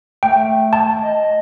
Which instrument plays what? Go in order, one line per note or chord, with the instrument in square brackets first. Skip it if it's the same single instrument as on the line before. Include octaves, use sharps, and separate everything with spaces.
[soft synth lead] A3 [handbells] G5
[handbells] A5
[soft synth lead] D#5